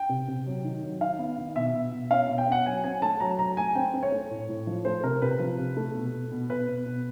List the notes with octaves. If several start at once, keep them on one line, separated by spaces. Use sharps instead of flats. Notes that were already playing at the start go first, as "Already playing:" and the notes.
Already playing: G5
C3
C3
F#3
D#3
F#3
D#3 F5
B3
D#3
B2 E5
B2
B2
C#4 F5
B2
G5
C#4 F#5
F#3 G#5
C4 G#5
A3 A5
F#3 A#5
F#3 A#5
A3 G#5
C4 G5
C4
C#5
A3
A2
A2
F3
A3 C5
C3 A#4
C3 B4
F3
C3
A3
B2
B2
B2
B2 B4
B2
B2